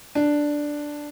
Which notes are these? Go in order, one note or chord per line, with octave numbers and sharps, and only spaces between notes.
D4